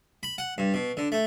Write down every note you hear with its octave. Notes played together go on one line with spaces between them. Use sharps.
B5
F#5
G2
B2
D3
A3